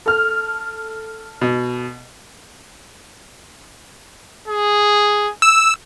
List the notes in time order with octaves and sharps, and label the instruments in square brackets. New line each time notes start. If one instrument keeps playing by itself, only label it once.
[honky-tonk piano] A4 F6
[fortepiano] B2
[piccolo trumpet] G#4
[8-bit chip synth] E6